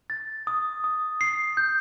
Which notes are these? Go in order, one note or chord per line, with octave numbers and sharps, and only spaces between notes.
A6
D#6
D#6
C7
G6